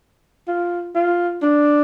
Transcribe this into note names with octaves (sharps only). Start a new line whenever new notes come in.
F4
F4
D4